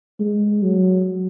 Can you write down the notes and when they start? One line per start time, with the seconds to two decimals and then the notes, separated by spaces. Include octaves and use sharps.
0.20 G#3
0.63 F#3